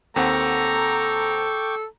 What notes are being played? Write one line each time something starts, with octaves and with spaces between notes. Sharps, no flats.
D#2 C4 A4 F#5 G5 A#5 C#6 D6